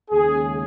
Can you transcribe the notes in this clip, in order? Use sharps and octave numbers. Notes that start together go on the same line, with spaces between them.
D#2 C#3 G#3 G#4